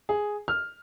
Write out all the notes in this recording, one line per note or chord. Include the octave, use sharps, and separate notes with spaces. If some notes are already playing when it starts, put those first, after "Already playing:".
G#4
F6